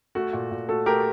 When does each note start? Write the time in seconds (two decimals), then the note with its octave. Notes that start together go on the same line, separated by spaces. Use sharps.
0.15 A3 F#4
0.33 A#2
0.51 A#2
0.68 A3 F#4 A4
0.86 A3 G4 A#4